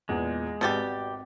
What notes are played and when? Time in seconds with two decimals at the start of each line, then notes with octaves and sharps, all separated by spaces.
0.09 E2 A#2 G#3
0.61 G#1 B2 G3 G4 A6